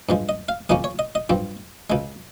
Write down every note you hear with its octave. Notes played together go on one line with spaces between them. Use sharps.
G2 F3 G#3
D#5
F5
D#2 C#3 F3 A#3 C#4 D#5
C#5
D#5
D#5
G2 F3 C4
C#2 C#3 G#3